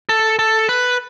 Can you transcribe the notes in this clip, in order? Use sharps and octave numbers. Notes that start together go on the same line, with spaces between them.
A4
A4
B4